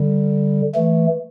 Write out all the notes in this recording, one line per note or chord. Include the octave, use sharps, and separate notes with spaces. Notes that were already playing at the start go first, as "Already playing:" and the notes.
Already playing: D3 G3
E3 A3